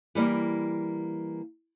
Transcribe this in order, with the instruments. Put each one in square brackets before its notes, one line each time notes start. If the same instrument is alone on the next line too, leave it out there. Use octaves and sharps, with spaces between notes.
[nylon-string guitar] E3 G3 A#3